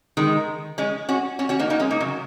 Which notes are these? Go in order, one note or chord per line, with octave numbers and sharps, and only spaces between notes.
D#3 G#3
G#3 C#4
C#4 F#4
C#4 F#4
C#4 F#4
A#3 D#4
A#3 D#4
G#3 C#4
A#3 D#4
C#3 F#3